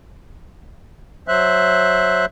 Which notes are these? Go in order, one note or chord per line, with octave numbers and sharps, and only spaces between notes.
F#3 C5 E5 F#6